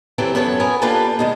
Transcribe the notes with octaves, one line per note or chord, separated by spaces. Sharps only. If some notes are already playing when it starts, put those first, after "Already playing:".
C3 E3 F#3 C4 E4 A4
F#2 B3 A4 C#5
B3 C#4 A#4 G#5
A#3 D4 F4 G4 A4 B4
B2 D#3 G#3